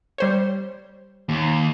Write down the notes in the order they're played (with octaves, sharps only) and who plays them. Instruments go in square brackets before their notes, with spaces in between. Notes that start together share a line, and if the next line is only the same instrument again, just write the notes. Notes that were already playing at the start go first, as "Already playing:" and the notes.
[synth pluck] G3 C5 C#5
[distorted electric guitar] D#2